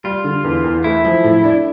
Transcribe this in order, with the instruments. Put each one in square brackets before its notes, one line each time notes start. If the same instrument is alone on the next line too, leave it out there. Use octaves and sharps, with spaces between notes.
[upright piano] G3 [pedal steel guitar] F4
[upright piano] D3
E2
E2
[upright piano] A3 [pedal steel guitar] E4
[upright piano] F3
A2
D4